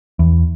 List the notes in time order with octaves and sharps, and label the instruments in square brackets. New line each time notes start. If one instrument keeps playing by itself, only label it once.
[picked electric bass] E2